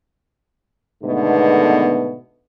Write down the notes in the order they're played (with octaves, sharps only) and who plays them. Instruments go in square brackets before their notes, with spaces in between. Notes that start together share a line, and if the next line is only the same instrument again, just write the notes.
[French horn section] G#2 B2 D3 D#3 A3 B3